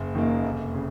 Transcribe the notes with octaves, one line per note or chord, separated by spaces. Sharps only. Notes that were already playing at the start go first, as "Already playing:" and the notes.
Already playing: F#1
F#2 D#3 A#3
F1
C#3